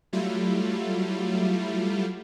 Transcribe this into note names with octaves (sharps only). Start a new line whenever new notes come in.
F#3 G3 A3 E4 F4